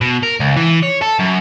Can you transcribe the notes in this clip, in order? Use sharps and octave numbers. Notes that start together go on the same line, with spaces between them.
B2
A#4
C#2
E3
C#5
A4
F#2